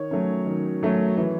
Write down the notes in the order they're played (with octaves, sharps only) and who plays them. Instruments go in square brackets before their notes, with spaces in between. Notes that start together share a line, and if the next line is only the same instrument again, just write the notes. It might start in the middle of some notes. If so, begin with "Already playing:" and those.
Already playing: [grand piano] D#3 C#5
F#3 A3 C#4
D#3
F#3 A3 C#4
E3